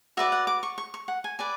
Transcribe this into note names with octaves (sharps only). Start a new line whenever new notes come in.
F#4 B4 D5 E5
F#5
D6
C#6
C#6
C#6
F#5
G#5
B4 D5 G#5